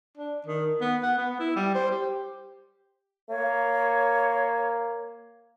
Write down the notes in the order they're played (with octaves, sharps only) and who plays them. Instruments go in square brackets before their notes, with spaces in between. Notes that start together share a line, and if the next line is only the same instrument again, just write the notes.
[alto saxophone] D4
D#3
B3
F#5
B3
E4
G3
C5
G4
[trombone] A#3 [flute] C#5